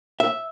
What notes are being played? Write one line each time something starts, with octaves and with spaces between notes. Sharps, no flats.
E5